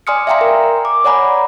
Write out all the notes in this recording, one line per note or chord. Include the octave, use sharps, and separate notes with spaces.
D5 G#5 C6 D#6 F6 C#7
E5 F5 G5 G#5 A#5 C6
A#4
D6
C#5 D5 F#5 G#5 A#5 B5